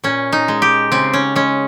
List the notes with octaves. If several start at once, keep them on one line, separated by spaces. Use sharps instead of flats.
A#2 C#4
D#4
G#3
G4
C#3 C4
C#4
G#3 C#4